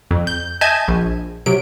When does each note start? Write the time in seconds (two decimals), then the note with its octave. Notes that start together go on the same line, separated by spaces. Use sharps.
0.11 F2
0.27 G6
0.61 D#5 E5 G#5 A5 G6 G#6
0.88 A#1
1.46 C3 F#3 D7